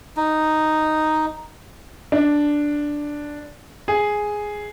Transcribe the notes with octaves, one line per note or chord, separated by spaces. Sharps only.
D#4
D4
G#4